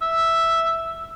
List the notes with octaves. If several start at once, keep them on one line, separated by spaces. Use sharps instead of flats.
E5